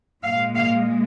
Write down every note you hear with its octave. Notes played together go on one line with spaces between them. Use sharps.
A#2 G#3 F5
F5